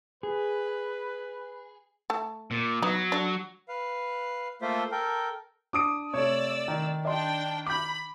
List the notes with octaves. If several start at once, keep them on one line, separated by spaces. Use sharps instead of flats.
G#4 B4
A3 A5
A#2
F#3 B3 D#4
D4 A4
B4 F5
A3 A#3 F4 A4 C5 E5
A4 A#4 G5
D4 D6 D#6 D7
C3 A3 C#5 D5 E6
D#3
D4 D5 D#5 G5 C6
B5 D6 G6